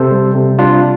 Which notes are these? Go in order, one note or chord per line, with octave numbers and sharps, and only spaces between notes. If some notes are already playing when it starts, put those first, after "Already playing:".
Already playing: C3 A4 C5
G3
C3
G3 D4 F4